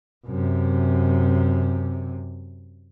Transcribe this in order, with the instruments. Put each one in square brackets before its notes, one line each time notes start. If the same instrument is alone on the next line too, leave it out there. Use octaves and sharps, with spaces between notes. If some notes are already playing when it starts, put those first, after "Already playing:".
[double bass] F#2 C3